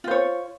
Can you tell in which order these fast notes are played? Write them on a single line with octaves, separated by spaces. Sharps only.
F4 C5 C#5